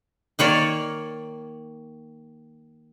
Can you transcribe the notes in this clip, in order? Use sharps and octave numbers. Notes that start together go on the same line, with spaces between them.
D#3 A#3 C#5 D5